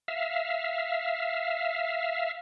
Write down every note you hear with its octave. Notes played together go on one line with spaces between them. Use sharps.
E5 F5